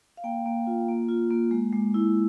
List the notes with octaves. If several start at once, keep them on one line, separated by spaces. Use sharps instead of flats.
F5
A#3 G5
A#3
F4
A#3
F4
A#3
G#3
G#3
E4